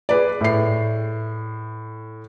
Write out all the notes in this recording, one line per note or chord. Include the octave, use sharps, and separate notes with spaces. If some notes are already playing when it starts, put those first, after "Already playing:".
G#4 B4 D5
A2 C7